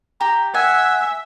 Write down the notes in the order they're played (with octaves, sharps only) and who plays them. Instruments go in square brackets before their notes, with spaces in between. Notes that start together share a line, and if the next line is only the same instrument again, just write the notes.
[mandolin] G4 [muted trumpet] A#5
[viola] E5 [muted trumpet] F#5 [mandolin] G#5